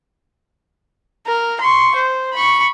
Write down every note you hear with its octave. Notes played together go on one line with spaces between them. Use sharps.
A#4
C6 C#6
C5
B5 C#6